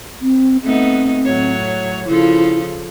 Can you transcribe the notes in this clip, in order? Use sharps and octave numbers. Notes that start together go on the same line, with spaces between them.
C4
A3 B3 C4 D#4
A2 F#3 C#5
C#3 F3 E4 A4